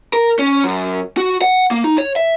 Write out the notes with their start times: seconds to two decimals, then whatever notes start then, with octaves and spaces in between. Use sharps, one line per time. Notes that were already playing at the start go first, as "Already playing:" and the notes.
0.13 A#4
0.39 C#4
0.64 F#2
1.17 F#4
1.42 F#5
1.71 A#3
1.84 D#4
1.98 C#5
2.16 E5